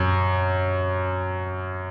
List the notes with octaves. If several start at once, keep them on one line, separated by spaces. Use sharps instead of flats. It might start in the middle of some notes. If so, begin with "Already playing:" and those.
Already playing: F#2